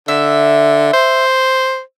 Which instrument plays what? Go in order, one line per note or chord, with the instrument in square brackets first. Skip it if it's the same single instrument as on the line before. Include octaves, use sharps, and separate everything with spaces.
[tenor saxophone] D3 [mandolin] E5
[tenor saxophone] C5